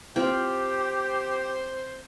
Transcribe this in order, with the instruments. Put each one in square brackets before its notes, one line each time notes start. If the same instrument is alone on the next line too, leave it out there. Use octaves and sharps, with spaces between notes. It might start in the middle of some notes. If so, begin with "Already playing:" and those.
[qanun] C4 F4 G5 [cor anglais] G4 [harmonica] C5